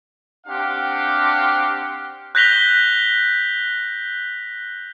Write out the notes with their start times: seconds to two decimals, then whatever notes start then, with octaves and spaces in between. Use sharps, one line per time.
0.47 C4 D4 G4 F5 F#5
2.35 F#6 G6 A#6 B6 F7 G7